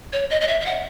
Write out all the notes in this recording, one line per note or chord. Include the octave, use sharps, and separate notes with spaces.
C#5
D#5
D#5
E5
E5
F#5